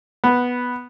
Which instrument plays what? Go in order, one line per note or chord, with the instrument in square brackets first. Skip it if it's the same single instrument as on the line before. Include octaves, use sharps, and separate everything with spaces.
[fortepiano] B3